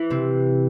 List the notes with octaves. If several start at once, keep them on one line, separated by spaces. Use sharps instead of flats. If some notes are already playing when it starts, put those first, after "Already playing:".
Already playing: E3
C3 C4